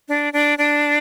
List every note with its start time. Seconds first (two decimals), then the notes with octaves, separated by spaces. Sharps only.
0.09 D4
0.33 D4
0.58 D4